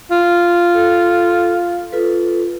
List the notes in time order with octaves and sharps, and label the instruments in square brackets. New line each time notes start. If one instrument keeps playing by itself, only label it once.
[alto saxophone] F4
[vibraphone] A4
F4 A4 B4